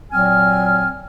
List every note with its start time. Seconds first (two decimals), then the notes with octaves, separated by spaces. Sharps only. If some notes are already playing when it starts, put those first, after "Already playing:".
0.12 A#2 F#3 C4 G#5 F6